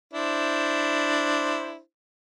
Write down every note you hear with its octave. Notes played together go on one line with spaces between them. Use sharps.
D4 E4 C5